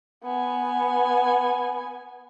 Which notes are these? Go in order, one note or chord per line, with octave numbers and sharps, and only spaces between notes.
B3 G#5